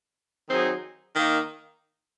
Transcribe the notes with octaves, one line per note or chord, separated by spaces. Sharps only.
D#3 F#3 C4 D#4 G#4
D#3 A#3 D#4